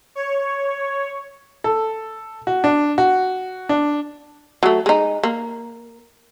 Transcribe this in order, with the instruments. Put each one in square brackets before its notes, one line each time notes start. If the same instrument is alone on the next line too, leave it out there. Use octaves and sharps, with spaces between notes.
[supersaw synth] C#5
[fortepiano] A4
F#4
D4
F#4
D4
[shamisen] F#3 A3
G#3 D#4
A#3